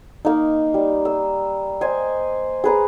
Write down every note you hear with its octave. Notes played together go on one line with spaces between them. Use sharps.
A#3 D#4
G3
E6
C5 D#5 G#5
G#4 B4 A#5